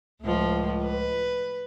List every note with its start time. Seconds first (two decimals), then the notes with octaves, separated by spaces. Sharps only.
0.22 C#2 A2 F3
0.84 B4